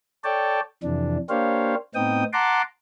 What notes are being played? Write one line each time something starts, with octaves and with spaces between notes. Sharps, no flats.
A4 C#5 D5 G5 A5
F2 C3 E3 D4
A#3 D4 G4 C5 C#5 F5
A2 B3 C4 D#4 G5 D#6
F#5 A5 A#5 C6 D6